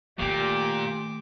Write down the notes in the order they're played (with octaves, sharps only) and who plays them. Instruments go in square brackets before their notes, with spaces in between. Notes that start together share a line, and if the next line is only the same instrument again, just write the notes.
[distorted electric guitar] A#2 [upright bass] D#3 A3 [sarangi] G4 [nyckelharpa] D6